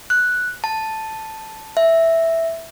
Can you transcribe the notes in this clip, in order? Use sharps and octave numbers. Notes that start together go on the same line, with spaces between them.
F#6
A5
E5